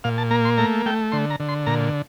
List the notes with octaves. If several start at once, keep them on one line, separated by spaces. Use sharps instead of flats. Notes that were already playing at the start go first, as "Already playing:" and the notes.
A#2 F5
A5
A#3 A#5
C6
A3 A#5
A3 G5
D3 C6
A#5
D3
C6
A#2 A#5